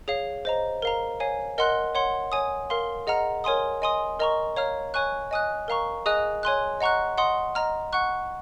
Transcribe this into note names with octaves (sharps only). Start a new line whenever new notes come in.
G#4 C#5 F5
C5 D#5 A#5
A#4 F5 A#5
C#5 F5 G#5
A#4 D#5 F#5 C6 F#6
C#5 F#5 C6
C#5 G#5 D#6
A#4 F5 C6
G#4 D#5 F#5 A#5 F6
A#4 C#5 G#5 C6 D#6
D#5 G#5 C6 D#6
A#4 D#5 A#5 C#6
C#5 F5 A#5 F6
C#5 G#5 C#6 F#6
D#5 G#5 D#6 F#6
A#4 F5 A#5 C#6
G#4 D#5 G#5 D#6 F#6
C#5 G#5 C6 F#6
D#5 F#5 A#5 C#6 F#6
D#5 F#5 C6 D#6
D#5 A#5 F6
F#5 C#6 F#6